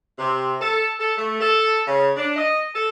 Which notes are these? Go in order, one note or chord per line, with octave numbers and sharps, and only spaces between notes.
C3
A4
A4
A3
A4
C#3
D4
D#5
A4